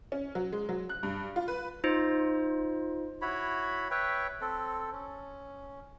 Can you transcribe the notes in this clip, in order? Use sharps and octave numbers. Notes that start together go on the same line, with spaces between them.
C#4
F#3
G#3
F#3
F#6
G2
F4
B4
D#4 F4 C5
E4 F#4 C#5 B5
B4 C#5 E5 G5
C4 A4
C#4